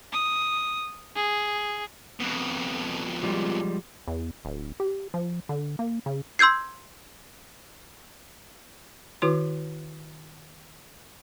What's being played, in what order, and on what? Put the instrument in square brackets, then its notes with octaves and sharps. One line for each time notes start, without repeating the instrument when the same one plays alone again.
[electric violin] D#6
G#4
[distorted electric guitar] F2 B2
[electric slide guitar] F3 G3 G#3
[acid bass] E2
D1
G4
F3
D3
A#3
C#3
[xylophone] C6 E6 G6 G#6 C7
[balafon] D#3 E4 F#4 B4 C6